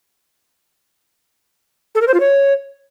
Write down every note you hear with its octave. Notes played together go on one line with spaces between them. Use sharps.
A4
A#4
C5
F4
C#5